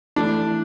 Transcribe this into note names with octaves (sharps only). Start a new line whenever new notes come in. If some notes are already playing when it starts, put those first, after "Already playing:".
E3 A3 D4 E4 A4